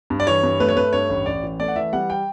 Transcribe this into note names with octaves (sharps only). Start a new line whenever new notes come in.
G2
D5
E3 C#5
G2
A3 B4
C#5
A3 B4
G2 C#5
A1
A1 D5
E3
A3 D5
F#5
E3 E5
G3 F#5
G5